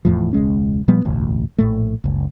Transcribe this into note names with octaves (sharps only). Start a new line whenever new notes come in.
F1 E2 A2 F3
E1 C#2 G#3 C#4
A#2 F3 G3 B3
E1 A1 D2
A#1 A2 A3
F#1 C#2